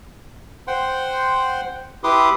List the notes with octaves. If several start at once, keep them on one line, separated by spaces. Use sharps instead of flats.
C5 F#5 G5 C6
E4 G4 B4 C6 D6 D#6